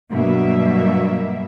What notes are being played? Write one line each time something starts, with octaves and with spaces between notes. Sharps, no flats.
G2 B2 F#3 A#3 E5